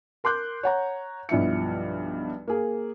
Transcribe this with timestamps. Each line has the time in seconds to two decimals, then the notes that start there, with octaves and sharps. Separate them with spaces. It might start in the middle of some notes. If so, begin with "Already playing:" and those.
0.24 A#4 C6 D6 F#6 G6
0.63 C#5 F#5 A#5
1.29 B1 G2 F3 E4 C#7
2.48 A#3 G#4